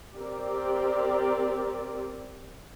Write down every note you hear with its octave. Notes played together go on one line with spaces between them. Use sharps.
C4 G4 A#4 D5